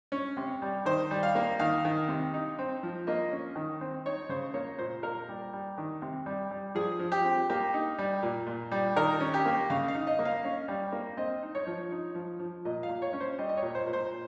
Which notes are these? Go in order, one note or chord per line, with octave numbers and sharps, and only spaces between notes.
C#4
C3
G3
D#3 C5
G3
F5
A#3
D#3 F5
D#3
C3
D#4
C4
F3
A#3 D#5
C#4
D#3
C4
D#4 C#5
C#3 C5
A#3 C#5
A#2 C5
A#3 A#4
G3
G3
D#3
C3
G3
G3
F3 G#4
F3
G4
C4
A#3 G4
D#4
G3
A#2
A#2
G3
D#3 A#4
C#4
G4
A#3
C#3 F5
F5
D#4
D#5
A#3
F5
C#4
G3
A#3
C4 D#5
D#4
C#5
F3
D#4
F3
F3
A#2 D#5
F5
A#2
C#5
C#4
C5
G3 D#5
D#5
C#5
A#2
C5
A#2
C5